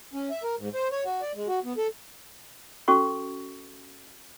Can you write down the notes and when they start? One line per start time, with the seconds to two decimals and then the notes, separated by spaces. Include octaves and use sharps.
0.13 C#4
0.30 E5
0.43 A#4
0.58 G#2
0.74 C5
0.91 C#5
1.05 F#4
1.22 D5
1.35 G#3
1.48 F#4
1.64 B3
1.77 A4
2.88 C#4 F#4 A4 C#6